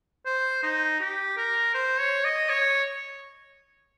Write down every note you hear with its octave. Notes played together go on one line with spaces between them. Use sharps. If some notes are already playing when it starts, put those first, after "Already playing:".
C5
D#4
G4
A#4
C5
C#5
D#5
C#5